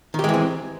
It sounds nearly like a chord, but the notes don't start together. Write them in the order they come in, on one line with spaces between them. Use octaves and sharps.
D#3 G4 G#3 E3 C4